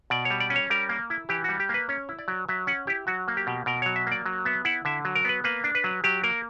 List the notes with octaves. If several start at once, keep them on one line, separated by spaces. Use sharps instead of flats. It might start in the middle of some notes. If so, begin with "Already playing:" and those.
B2 D5
C#5
G3
D5
C#4
C#5
G3 A#4
A#3
E4
E3 G4
G3 F#4
G4
A#3 B4
C#4 C#5
E4
D5
F#3
F#3 E5
C#4 F#5
E4 G4
F#3 F#4
A#3
G4
B2
B2 A#4
F#3 C#5
E5
A#3 D5
F#3
B3 E5
E4 F#5
D3 E5
F#3
A#4
B3 B4
A#3 B4
D4
B4
F#3
F#3 G4
A#3 A#4